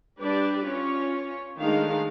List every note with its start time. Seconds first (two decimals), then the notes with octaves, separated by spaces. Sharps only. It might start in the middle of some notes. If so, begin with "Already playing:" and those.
0.19 G3 D4 G4 B4 D5
0.66 C#4 F4 C#5
1.61 D#3 G#3 A3 D4 F5